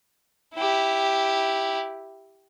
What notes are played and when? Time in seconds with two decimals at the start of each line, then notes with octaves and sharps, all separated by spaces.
0.55 E4 G4